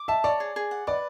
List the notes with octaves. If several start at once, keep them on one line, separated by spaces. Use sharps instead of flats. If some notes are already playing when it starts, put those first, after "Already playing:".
Already playing: D6
E5 A5
C#5 D5
G#4
G#4
F#5
B4 D5